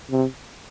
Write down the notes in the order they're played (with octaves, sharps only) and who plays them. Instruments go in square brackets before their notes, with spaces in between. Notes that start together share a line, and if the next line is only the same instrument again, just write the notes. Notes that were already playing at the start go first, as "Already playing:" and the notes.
[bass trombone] C3